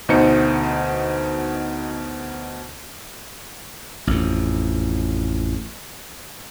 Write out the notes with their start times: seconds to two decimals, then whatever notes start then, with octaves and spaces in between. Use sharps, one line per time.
0.09 D2 B2 D#4 C5 C#7
4.07 A1 F2